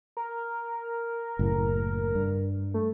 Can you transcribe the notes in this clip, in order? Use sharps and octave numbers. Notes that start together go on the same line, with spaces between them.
A#4
F#1 A2
G2
A3